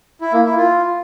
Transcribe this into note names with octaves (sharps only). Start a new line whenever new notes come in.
E4
A#3
E4
F4